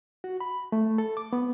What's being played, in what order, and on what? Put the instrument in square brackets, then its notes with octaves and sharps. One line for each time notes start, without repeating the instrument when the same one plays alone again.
[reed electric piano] F#4
B5
A3
A4
D6
B3